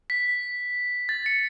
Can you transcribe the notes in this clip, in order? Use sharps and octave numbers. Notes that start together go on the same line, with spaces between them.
B6
A6
C#7